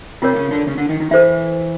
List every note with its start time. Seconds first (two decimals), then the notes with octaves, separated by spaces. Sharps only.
0.22 C3 C4 F4 A#4 C#5
0.36 C#3 C#4
0.51 D3 D4
0.67 C#3 C#4
0.77 D3 D4
0.89 D#3 D#4
1.00 D#3 D#4
1.11 E3 E4 A4 C5 E5